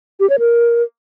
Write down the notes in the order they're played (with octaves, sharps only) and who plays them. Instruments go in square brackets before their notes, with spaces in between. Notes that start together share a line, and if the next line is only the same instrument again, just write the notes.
[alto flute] G4
C#5
A#4